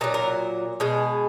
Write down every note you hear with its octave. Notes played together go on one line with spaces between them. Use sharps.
A#2 F#3 D#4
A#4
B2 G#3